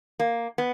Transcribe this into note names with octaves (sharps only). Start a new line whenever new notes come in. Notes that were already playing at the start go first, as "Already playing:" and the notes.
A#3
B3